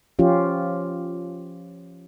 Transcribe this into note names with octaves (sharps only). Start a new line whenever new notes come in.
F3 C#4 F4 G4